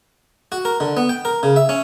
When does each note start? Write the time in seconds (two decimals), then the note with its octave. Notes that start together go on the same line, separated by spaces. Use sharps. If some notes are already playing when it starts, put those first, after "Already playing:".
0.52 F#4
0.65 A#4
0.80 D3
0.97 B3
1.09 G5
1.25 A#4
1.43 C#3
1.56 E5
1.69 C#4